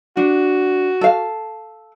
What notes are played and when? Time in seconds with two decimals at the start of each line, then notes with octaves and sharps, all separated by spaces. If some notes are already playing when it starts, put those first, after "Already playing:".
0.17 D4 F#4
1.01 A4 F5